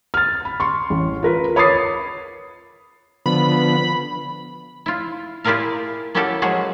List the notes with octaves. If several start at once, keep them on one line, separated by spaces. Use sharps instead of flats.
F6 A6
B5
C6 C#6
A1
F4 A#4 B4
C#5 B5 D6 D#6 A6 C7
D3 F3 B3 B5
E4 F4
E4 F4 G4 G#4 A#4 F5
A#3 C#4 E4 F#4 G4 A4
F3 F#3 G#3 F#4 G#4